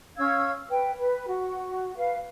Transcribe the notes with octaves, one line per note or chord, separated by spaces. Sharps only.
C#4 F5 E6 G#6
B4 G5
B4
F#4
B4 F5